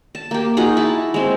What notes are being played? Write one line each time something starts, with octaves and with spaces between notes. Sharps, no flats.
A5
A#3 G4
D#4 F4 F#4 G#4
E4 A5
G#3 C4